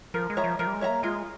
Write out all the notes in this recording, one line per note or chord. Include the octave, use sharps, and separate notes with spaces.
F3 A#4
G#3
C#5 E5 A#5
F3
F3 A#4
G3
G#3
C#5 E5 A#5
A#3
G#3 F4